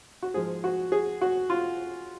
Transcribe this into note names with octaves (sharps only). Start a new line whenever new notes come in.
F#4
G#2 F3 G#4
F#4
G#4
F#4
F4